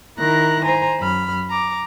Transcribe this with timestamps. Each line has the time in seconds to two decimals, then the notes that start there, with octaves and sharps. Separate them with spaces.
0.18 D#3 E4 A#4 A#5 F#6 A#6
0.64 C5 G#5 A#5
0.99 F#2 B5 F6
1.50 A#5 D6